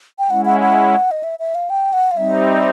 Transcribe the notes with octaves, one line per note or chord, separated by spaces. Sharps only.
G5
G#3 C#4 E4 F#5
F#5
F#5
D#5
E5
E5
F5
G5
F#5
F5
G3 C4 D#4 E5